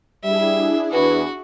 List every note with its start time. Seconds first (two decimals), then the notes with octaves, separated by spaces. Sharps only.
0.24 G3 D4 E4 G#4 E5
0.91 E2 F#4 B4